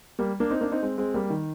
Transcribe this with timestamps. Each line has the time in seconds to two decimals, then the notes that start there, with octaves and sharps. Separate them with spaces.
0.19 G3 A#3
0.40 A#3 D4
0.50 C4 D#4
0.61 A#3 D4
0.72 C4 D#4
0.83 G#3 C4
0.98 G#3 C4
1.14 G3 A#3
1.30 D#3